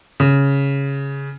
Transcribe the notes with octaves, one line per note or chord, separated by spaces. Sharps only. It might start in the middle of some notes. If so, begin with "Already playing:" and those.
C#3